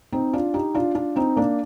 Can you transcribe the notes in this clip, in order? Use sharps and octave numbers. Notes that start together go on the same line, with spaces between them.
C4 D#4
D4 F4
D#4 G4
D4 F4
D4 F4
C4 D#4
A#3 D4